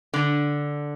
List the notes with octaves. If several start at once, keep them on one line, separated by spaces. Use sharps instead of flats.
D3